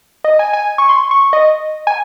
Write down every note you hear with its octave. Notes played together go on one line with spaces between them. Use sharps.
D#5
G#5
G#5
C#6
C6
C#6
D#5
G#5